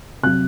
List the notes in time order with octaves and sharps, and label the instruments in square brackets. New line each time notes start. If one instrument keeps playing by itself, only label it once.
[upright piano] C3 F#3 F#6